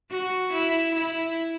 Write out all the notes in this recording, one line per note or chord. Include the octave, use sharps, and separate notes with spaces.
F#4
E4
E4